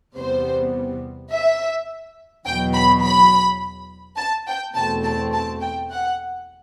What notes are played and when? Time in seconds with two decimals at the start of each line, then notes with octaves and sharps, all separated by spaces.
0.16 E2 C3 G3 B3 C5
1.31 E5
2.46 E2 B2 F#3 G5
2.75 B5
3.03 B5
4.18 A5
4.47 G5
4.76 E2 B2 A3 C4 A5
5.04 A5
5.33 A5
5.61 G5
5.91 F#5